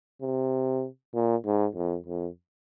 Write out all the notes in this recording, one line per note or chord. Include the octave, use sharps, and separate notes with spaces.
C3
A#2
G#2
F2
F2